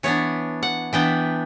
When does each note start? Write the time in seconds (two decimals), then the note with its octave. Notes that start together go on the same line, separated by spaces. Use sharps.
0.03 E3 B3 D4 C#5
0.63 F#5
0.93 E3 B3 D4 G5